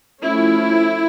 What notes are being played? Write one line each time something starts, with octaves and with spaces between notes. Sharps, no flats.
F3 A3 C#4 E4